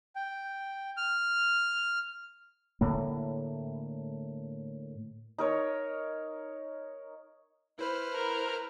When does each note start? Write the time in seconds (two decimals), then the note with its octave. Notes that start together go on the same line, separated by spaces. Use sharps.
0.16 G5
0.97 F6
2.81 A2 D3 A#3
5.38 D#4 A#4 C#5
7.79 E4 B4 C5 F6
8.14 A#4